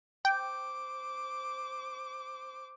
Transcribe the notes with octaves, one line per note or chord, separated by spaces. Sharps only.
C5 G5 D6